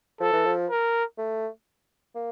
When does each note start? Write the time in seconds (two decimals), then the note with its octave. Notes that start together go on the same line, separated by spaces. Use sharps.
0.21 F3 A4
0.33 E3
0.45 F3
0.70 A#4
1.18 A3
2.15 A#3